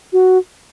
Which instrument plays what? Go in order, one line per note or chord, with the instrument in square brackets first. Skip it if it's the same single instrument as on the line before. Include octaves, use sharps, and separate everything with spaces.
[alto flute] F#4